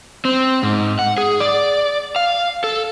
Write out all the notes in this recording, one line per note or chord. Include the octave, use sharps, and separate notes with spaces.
C4
G#2
F#5
G#4
D5
F5
A4